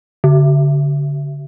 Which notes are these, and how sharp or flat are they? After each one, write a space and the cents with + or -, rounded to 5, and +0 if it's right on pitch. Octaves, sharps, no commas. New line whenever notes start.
D3 -35